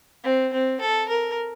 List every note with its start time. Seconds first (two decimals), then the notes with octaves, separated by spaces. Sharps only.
0.24 C4
0.53 C4
0.80 A4
1.09 A#4